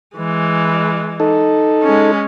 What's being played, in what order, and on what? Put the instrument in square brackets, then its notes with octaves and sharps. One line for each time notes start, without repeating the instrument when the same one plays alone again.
[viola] E3 G#3
[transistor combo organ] D#4 A4
[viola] G#3 C#4